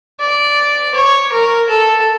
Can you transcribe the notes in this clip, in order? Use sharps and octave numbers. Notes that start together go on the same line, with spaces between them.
D5
C#5
A#4
A4